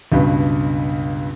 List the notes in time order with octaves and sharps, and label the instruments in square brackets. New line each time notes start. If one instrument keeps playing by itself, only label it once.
[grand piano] C#2 G2 B2